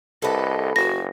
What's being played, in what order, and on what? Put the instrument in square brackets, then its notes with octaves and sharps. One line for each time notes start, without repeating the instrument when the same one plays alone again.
[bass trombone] C2 [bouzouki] A4 B4 [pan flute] D#5
[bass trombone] F#1 [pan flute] F#4 [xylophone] A#6